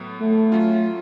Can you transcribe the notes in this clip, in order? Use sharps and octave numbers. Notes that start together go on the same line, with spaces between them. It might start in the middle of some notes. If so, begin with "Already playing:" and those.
Already playing: A2 F#3 B3
A3
F#3 C#4 F4